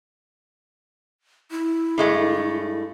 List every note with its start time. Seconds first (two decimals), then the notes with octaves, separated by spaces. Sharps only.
1.51 E4
1.98 G2 G#3 A3